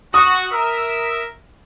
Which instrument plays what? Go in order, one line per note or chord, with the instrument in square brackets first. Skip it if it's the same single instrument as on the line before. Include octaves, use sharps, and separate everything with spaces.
[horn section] F#4 [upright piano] D#6
[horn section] A#4 E5